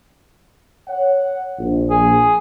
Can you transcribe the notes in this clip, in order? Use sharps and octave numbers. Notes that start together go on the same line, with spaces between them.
C#5 F#5
A#1
G#4